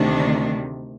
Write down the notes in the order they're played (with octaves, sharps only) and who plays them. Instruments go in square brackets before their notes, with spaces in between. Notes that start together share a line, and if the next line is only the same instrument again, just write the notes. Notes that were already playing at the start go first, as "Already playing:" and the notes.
Already playing: [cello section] D2 C3 D#3 D4